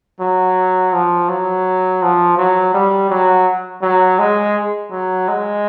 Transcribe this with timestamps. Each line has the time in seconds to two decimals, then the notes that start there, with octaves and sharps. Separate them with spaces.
0.20 F#3
0.93 F3
1.29 F#3
2.02 F3
2.38 F#3
2.74 G3
3.10 F#3
3.82 F#3
4.19 G#3
4.91 F#3
5.28 G#3